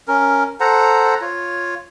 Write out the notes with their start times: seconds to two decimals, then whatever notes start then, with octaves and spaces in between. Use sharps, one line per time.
0.08 C#4 A#4
0.60 A4 C5 F#5 A#5
1.21 F4 C#5